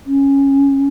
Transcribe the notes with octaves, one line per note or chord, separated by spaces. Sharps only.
C#4